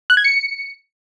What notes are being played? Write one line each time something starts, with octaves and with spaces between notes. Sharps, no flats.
F#6
G#6
C#7